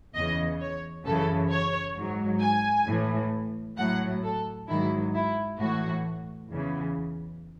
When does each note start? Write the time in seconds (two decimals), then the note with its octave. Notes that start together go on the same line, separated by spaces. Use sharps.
0.14 E2 C#3 E3 D#5
0.60 C#5
1.05 F#2 C#3 E3 A4
1.51 C#5
1.97 G#2 F#3
2.42 G#5
2.86 A2 E3
3.77 A2 F#3 F#5
4.23 A4
4.68 G#2 D#3 F#3 E4
5.14 E4
5.58 A2 E3 F#4
6.49 E2 C#3 E3